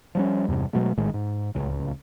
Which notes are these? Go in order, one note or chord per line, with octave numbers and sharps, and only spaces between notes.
F3 G3 C#4
E2 G2 C3
B2 F#3 G#3 A3
A#1 A2 D#3 G#3
G#2
D1 G1 C#2 C#3